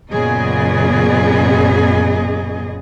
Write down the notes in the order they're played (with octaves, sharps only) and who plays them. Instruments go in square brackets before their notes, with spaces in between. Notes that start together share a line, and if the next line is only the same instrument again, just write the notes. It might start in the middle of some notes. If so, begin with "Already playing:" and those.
[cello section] F#2 A#2 C#3 B3 G#4 D#5